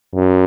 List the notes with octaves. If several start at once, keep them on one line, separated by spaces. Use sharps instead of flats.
F#2